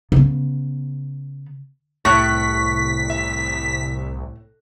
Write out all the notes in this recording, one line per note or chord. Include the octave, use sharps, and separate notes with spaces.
C#3 B3
C2 A2 C#6 F#6 B6
E5